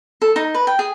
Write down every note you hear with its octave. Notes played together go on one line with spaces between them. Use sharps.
A4
D#4
B4
G5
G#4